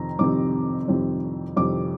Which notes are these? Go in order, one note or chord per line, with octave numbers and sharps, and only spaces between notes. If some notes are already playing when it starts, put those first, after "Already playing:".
Already playing: F2 C3 D#3 C4 A#5
F2 C3 D#3 G3 C4 D6
F2 C3 D#3 G3 C4
F2 C3 D#3 G3 C4 D6